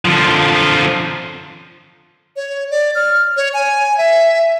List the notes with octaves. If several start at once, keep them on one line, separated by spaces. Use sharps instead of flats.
D3 F3
C#5
D5
F6
C#5
G#5
E5